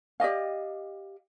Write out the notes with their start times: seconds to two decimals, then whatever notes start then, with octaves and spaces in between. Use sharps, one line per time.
0.20 G4 D5 D#5 F5